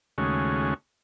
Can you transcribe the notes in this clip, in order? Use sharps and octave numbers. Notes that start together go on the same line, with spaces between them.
D#2 C#3 G#3 A3 C#4 F#4